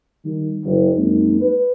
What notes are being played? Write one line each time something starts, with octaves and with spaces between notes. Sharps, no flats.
D#3 G3
F#1
F#2 G#3 A#3 C4 D#4
B4